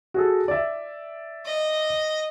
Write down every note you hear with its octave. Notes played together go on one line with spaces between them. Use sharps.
F#4 G#4 A4
D5 E5
D#5